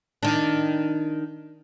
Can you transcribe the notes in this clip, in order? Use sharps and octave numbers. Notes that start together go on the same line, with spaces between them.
D#3 D4